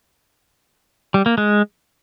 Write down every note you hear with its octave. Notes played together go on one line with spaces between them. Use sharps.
G3
A#3
G#3